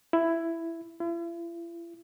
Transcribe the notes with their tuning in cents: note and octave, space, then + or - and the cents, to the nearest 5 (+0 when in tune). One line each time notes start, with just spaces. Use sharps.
E4 +10
E4 +45